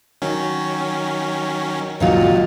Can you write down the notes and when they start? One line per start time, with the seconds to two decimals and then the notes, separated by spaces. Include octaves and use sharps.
0.22 D#3 F#3 C#4
2.00 C#2 A#2 D#3 F#3 F4